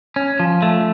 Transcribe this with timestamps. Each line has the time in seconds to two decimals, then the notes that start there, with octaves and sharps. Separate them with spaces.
0.16 C#4
0.40 F3
0.62 A3